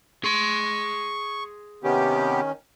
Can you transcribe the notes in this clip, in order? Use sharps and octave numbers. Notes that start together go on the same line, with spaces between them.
G#4 C6 C#6
C3 D#3 B3 C#4 G4